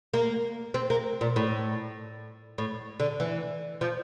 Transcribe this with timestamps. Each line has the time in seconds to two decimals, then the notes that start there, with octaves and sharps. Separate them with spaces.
0.14 A#3
0.74 C4
0.90 A#3
1.21 A#2
1.36 A2
2.58 A2
3.00 D3
3.20 E3
3.81 F3